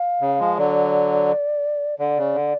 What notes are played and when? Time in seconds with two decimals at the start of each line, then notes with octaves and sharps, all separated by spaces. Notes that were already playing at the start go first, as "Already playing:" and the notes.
Already playing: F5
0.21 C#3
0.39 F3 G#3
0.58 D3 F#3 D5
1.99 D3 D5
2.18 C#3
2.35 D3